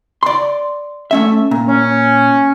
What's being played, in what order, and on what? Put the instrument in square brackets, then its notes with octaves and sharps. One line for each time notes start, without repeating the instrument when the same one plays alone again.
[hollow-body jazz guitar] D5 C6
A3 C#4 E5
A#2
[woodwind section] C#4